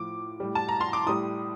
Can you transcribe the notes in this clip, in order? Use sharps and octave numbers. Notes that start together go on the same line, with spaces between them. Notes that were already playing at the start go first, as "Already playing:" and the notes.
Already playing: A2 F3 D6
A2 G3
A5
A#5
C6
D6
A2 G3 D#6